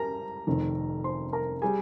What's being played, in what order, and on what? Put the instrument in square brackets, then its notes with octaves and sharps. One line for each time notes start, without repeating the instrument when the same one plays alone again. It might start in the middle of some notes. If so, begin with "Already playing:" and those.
Already playing: [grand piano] G3 A#4 A#5
F1 F2 D#3
C5 C6
A#4 A#5
G3 G#4 G#5